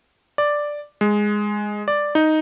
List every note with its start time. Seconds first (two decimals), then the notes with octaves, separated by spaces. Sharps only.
0.38 D5
1.01 G#3
1.88 D5
2.15 D#4